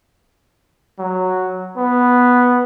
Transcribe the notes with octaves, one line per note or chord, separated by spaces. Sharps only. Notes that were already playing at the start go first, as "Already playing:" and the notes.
F#3
B3